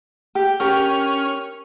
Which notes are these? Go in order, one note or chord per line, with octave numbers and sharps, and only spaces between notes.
G4
C#4 G4 A#4 F6